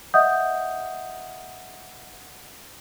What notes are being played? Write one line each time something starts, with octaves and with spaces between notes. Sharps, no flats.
D#5 E5 F#5 D#6 G6